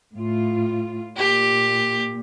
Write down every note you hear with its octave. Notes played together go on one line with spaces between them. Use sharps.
A2 F4
A#2 G4